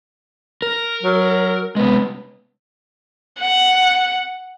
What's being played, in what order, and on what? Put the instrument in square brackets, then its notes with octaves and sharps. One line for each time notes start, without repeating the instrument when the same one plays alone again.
[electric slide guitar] A#4
[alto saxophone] F#3
[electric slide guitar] C3 G#3 [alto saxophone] B3
[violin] F#5